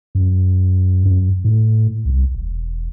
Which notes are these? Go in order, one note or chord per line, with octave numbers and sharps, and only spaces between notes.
F#2
F#2
A2
C2
E1